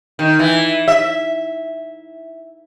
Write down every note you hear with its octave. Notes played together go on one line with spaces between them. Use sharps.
D#3
E3
E5